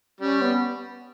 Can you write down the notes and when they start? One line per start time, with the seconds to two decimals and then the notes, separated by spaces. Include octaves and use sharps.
0.20 G3 C#4
0.41 B3